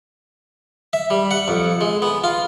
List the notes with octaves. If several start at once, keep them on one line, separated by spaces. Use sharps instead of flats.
E5
G3
F#5
F2
G#3
B3
F4